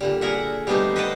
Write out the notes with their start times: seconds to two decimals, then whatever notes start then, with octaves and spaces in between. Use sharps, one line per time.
0.01 A#2 D3 G3
0.21 G#4 A#4 E5 F#5
0.67 G3 A3 B3 D4 D#4 C5
0.96 B4 C5 D#5 F#5 G5 A5